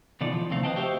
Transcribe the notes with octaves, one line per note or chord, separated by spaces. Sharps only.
B2 D#3 E3 F4 A4 D5
F3
D#2 C3 D#3 A3 C4 F5
B4 C5 D#5 G5 A5
F#4 G4 C5 E5 F5 G5